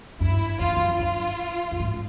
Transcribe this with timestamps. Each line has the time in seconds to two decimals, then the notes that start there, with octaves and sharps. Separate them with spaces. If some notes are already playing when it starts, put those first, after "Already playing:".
0.20 G2 E4
0.60 F#2 F4
0.69 F2
0.77 F#2
1.00 G2 F4
1.72 G2
1.80 G#2